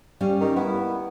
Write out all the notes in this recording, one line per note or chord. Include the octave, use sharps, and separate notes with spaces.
G3 C#4 F5
D#3
B3 E4